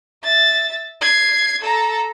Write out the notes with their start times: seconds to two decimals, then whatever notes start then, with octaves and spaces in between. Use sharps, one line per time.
0.23 E5 A6
1.01 G#6 C7
1.61 A4 A#5